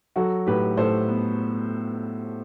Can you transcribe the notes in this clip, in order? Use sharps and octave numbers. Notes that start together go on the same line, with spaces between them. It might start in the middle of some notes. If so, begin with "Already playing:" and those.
F#3 F#4 A4
A2 G4 B4
A2 A4 C5
B3